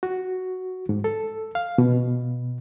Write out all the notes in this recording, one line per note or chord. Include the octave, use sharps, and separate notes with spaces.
F#4
G#2
A4
F5
B2